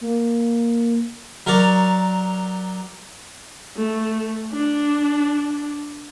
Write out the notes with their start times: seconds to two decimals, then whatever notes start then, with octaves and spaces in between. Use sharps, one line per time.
0.01 A#3
1.47 F#3 A#4 C#5 D5
3.77 A3
4.52 D4